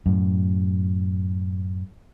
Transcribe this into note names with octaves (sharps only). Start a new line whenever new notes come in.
F#2 A2